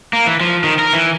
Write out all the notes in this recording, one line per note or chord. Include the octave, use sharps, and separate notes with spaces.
A#3
E3
F3
D#3
A#4
E3